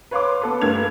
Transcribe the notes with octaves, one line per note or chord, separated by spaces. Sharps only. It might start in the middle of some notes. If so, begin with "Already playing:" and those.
B4 C#5 F5 C6 D6
B3 A4 B4
G2 A3 A#4 G#6 F7